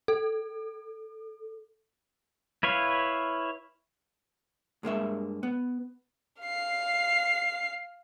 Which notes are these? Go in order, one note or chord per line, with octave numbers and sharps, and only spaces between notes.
A4
E4 B4 C#5 F5
G2 G#3 A#3 E5
B3
F5 C7